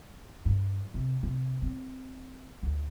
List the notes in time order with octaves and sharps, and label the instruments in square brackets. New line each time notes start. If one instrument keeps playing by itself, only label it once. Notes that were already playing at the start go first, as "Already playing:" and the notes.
[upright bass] G2
C3
C3
C4
D2